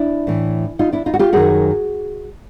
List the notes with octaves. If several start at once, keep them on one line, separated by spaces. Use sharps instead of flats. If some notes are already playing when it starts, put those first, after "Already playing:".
Already playing: D4 E4
A2 E3
D#4 F4
D4 E4
D#4 F4
F#4
F4 G4
F#2 D#3 F#4 G#4